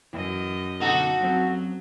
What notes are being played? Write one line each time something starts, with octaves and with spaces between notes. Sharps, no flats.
F#2 E3 D#5
B2 D3 D#4 F#4 A4
F#2 F#3 C4